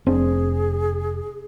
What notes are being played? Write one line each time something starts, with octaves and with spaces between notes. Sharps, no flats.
F1 C4 D4 G#4